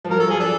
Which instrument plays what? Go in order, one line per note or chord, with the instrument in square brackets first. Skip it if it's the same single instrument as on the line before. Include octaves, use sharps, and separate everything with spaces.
[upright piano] F3
[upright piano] F#3 [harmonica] A#4
[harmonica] A4
[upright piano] F3 [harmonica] G#4
[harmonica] D4 A4